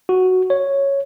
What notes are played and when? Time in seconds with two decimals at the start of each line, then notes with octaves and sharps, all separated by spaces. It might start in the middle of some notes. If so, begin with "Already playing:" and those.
0.09 F#4
0.50 C#5